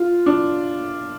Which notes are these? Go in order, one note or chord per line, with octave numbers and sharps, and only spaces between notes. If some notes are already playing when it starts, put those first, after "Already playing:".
Already playing: F4
D4